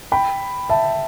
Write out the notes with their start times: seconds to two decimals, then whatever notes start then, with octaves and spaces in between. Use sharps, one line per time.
0.12 G5 B5
0.70 E5 A5